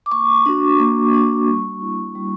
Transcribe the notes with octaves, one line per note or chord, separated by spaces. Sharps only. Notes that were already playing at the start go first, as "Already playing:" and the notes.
D6
A#3 C#6
D4 F#4
A#3
D4 F#4
G3
A#3 E4
G3